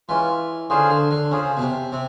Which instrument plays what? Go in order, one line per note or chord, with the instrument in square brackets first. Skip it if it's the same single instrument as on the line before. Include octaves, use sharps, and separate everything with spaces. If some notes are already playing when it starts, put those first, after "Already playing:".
[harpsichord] E3 [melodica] G#3 C#4 F4
[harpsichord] D3 [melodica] C#4 F4 G#4 C5
[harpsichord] D3
D3
[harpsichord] C#3 [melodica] C#4 F4 G#4 C5
[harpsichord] B2
C3
[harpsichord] C3 [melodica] C4